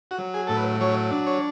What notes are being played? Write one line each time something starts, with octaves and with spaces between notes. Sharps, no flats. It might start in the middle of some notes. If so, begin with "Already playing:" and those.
F#4
F#3
G#4
A2 A4
B4
F#3 C#5
D4
C#5